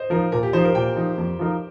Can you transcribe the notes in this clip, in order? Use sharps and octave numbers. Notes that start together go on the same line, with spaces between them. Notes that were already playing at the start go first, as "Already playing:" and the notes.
Already playing: C5 D#5
F3 D#4 A#4
A#2 A#4
G4
F3 D#4 C5
A#4
A#2 G5
F3 D#4
F2
F3 D#4 A#4